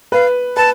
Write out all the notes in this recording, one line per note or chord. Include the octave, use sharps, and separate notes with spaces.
B4 F5
B4 A5